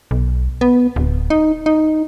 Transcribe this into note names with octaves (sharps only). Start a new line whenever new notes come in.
B1
B3
D1
D#4
D#4